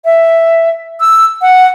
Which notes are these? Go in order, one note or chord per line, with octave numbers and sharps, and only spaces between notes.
E5
E6
F#5